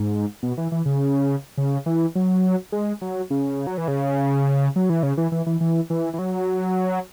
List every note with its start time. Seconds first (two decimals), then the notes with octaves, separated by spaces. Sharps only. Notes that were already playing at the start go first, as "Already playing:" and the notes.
Already playing: G#2
0.43 B2
0.58 E3
0.72 E3
0.86 C#3
1.58 C#3
1.86 E3
2.15 F#3
2.72 G#3
3.01 F#3
3.30 C#3
3.67 F#3
3.78 E3
3.88 C#3
4.76 F#3
4.90 E3
5.03 C#3
5.17 E3
5.32 E3
5.46 E3
5.61 E3
5.90 E3
6.13 E3
6.19 F#3